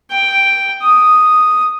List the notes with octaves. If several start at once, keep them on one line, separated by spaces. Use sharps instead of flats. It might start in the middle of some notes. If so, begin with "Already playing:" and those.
G5
D#6